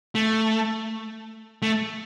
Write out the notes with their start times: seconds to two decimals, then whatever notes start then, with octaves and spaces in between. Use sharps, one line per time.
0.15 A3
1.62 A3